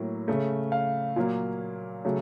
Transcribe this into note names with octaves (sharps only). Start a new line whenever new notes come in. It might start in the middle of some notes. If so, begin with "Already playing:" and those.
Already playing: A2 F#3 A#3
C#3 A3
F5
A#2 F#3 A#3
C#3 F#3 A3